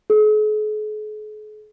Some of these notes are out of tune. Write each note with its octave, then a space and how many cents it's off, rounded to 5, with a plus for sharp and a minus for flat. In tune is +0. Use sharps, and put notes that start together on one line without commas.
G#4 +45